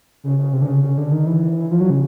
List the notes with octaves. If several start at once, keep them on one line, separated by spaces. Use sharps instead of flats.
C#3
C#3
C3
D3
C#3
C#3
D3
D#3
E3
F3
F#3
C#3